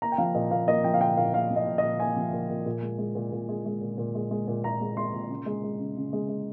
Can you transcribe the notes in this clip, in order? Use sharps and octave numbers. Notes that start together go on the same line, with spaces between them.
A#3 A#5
G5
F3 F5
A#2 D#5
A#2 F5
A#3 D#5
F3 G5
F5
A#2 G5
A#2 F5
A#3 F5
F3
D#5
A#2
D#5
A#2
A#3 G#5
F3
A#2
A#2
A#2
G#3
G#3
A#2
A#2
G#3
G#3
A#2
A#2
G#3
G#3
A#2
A#2 A#5
G#3
G#3 C6
A#2
C#3
G#3
G#3
C#3
C#3
G#3
G#3